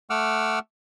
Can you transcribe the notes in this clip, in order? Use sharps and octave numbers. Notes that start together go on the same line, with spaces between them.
A3 F#5 D6 E6 F6